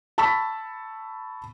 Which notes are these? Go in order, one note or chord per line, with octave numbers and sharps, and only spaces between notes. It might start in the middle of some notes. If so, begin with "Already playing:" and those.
A5 B5 C#6 E6 B6